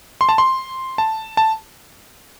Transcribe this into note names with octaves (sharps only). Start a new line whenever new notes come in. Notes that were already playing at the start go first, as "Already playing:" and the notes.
C6
A5
C6
A5
A5